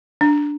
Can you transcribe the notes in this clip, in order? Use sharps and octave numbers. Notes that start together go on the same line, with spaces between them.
D4